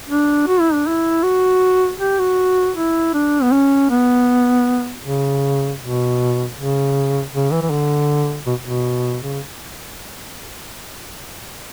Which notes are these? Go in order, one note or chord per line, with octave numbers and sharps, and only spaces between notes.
D4
F#4
E4
D4
E4
F#4
G4
F#4
E4
D4
B3
C#4
B3
C#3
B2
C#3
C#3
E3
E3
D3
B2
B2
C#3